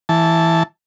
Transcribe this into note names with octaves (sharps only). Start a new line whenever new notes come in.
E3 A5